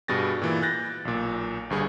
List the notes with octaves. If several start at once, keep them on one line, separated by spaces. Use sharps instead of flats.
G2 B2 G3 G#4 A6 A#6
A#2 E3
F#6 G6 A6 A#6
B1 A#2
G1 G2 G#4